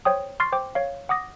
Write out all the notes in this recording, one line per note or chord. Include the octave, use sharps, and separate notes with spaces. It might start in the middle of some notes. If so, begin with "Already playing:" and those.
C5 C#5 G5 D#6
C6 C#6 F6 A6 C7
C5 G5 D6
C#5 F5
F#5 D6 D#6 A#6